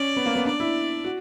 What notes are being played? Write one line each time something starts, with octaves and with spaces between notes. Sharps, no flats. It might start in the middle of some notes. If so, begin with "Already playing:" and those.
Already playing: C#4 D5
B3
A#3
B3
D4 D5
E4
F#4